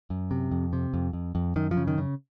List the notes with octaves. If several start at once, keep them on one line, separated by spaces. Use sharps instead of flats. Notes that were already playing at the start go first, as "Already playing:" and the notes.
F#2
C3
F2
C3
F2
F2
F2
F#2 D#3
F3
C#3
D#3
C#3